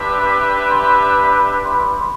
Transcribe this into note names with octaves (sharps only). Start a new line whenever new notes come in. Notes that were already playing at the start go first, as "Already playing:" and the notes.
Already playing: D4 G4 B4 E5 A5 B5 C6
C6
B5
B5
C6
B5
C6